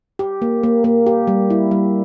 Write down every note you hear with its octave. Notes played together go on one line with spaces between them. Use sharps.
G4
A#3
A#3
A#3
G4
G3
E4
G3